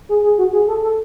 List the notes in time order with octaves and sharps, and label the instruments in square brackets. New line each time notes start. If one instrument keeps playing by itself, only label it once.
[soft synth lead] G#4
G#4
F#4
G#4
A4
A4